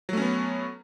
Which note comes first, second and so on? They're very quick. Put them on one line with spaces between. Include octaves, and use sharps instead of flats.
F#3 A3 C#4 B3